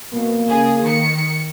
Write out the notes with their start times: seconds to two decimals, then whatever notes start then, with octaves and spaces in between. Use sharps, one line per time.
0.13 B2 A#3
0.48 C#3 G#4
0.82 D#3 C#7